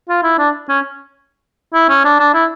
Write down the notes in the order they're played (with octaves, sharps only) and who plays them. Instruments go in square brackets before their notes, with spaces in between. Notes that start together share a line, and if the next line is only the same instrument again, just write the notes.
[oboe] F4
E4
D4
C#4
E4
C#4
D4
D4
E4